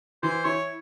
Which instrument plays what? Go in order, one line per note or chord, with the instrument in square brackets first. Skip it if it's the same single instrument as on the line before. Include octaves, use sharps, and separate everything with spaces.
[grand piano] E3 [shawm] C5
[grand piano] E4 [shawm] C#5